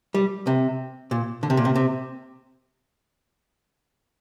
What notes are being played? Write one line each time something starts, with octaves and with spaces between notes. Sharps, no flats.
G3
C3
A#2
D3
C3
A#2
C3
C3